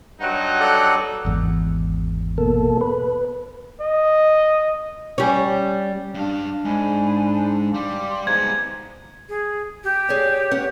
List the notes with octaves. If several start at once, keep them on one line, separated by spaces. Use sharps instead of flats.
G2 F#3 D#4 F#5
A4 D5 F#5
G#1 E2
B2 A#3 A4
B4
D#5
G3 C#4
G2 D4 F5
G#2 D5 G#5 B5
G3 F5 C6 D6
G#3 B3 D#4 C5 A#5 G#6
G#4
G4
G#4 C#5 D5
B3 C#4 F#5